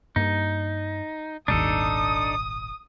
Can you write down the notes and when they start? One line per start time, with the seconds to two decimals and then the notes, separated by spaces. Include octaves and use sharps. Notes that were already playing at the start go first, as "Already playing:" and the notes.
0.16 G2 A#3 D#4
1.48 D#1 G#1 D#2 D4 D#4 A4 D#6